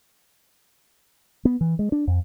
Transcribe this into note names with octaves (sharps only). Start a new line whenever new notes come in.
B3
E3
G#3
D4
F2